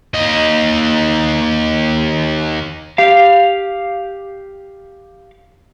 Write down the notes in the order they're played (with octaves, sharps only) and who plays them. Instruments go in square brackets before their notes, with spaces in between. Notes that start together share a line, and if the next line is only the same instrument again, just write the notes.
[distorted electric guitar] D#2 D#5
[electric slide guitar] G4 F5